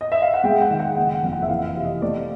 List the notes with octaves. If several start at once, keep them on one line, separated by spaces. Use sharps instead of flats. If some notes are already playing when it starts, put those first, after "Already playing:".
D#5
E5
F5
F#5
G#3 G5
F#5
D#3
F#5
F#1 F#5
F#5
F2
F#5
E5
E3 F5
C3
D#5
A3 D5